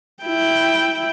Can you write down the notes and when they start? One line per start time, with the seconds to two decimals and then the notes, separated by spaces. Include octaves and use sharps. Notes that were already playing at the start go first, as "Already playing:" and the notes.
0.23 E4 G5